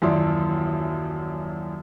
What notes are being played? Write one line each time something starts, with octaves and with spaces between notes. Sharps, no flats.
D#1 F#2 E3 D5 E5 C6